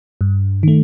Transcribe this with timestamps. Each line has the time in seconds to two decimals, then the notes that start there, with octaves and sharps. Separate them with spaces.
0.21 G2
0.63 D#3 A3